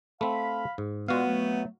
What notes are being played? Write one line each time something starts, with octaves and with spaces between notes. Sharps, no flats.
A3 C4 F5 B5
G#2
A#2 G#3 B3 F#4 F5
F#3 A3